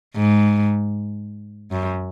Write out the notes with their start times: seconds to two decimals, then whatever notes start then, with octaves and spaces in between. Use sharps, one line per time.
0.16 G#2
1.71 F#2